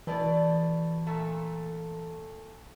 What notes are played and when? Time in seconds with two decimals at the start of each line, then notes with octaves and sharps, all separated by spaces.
0.07 B2 E3 A3 D5
1.07 A#2 A3 A4